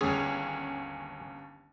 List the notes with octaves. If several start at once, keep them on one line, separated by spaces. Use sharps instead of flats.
G1 D#2 C#4 G#4